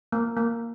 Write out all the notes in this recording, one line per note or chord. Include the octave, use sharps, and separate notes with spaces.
A#3
A#3